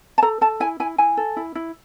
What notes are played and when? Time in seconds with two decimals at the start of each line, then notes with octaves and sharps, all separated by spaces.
0.18 A5
0.22 A4 A#5
0.41 A4 A5
0.60 E4 G#5
0.80 E4 G#5
0.98 E4 G#5
1.17 A4
1.37 E4
1.55 E4